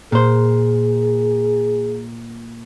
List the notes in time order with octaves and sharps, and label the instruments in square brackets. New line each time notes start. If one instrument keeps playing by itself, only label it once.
[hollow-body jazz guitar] A#2 C5 [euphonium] G#4